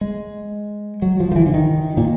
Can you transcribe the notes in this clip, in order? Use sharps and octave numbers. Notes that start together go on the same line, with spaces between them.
G#3
F#3
F3
F3
E3
D3
D#3
A#2